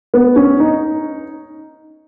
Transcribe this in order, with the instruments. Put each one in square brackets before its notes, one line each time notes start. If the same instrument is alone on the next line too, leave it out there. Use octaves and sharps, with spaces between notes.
[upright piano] B3
C#4
D#4